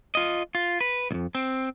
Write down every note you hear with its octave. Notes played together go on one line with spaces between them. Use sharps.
F4 D#5
F4
B4
C2 F2
C4